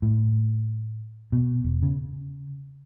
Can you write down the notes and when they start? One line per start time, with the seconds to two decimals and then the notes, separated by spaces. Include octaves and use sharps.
0.02 A2
1.32 B2
1.64 E1
1.83 C#3